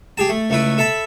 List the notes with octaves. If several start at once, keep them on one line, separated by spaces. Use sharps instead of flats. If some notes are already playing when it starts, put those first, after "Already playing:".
G4 G#4 A5
A3
C#2 A3 E4 B4
A4 E5 A5 B5